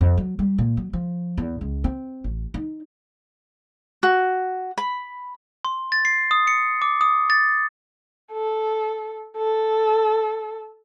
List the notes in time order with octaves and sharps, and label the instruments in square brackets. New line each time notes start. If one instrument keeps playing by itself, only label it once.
[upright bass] F2
F#3
G3
A#2
F#3
F3
E2
C#2
C4
A1
D#4
[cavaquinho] F#4
B5
[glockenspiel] C6
A6
C7
D#6
C#7
D6
D#6
A6
[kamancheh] A4
A4